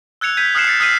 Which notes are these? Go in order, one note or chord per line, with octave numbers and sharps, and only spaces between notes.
E6 F#6 G#6 C#7 F7
G6 G#6 B6 D#7
D#6 F6 F#6 C7 C#7 E7
A6 B6 C#7
D#6 F6 G#6 B6 C7 D#7